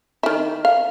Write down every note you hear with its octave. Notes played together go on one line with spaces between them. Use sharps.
D#3 E4
F5